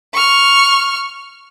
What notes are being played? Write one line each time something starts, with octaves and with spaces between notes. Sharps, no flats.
C#6 F6